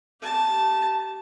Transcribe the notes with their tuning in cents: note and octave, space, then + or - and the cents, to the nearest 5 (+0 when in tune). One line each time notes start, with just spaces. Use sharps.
G4 -30 A5 +0